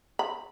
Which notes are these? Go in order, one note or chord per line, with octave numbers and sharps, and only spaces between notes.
B5